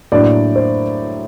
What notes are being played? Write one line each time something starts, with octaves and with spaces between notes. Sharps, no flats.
A2 F#3 A#3 D4 D5
C5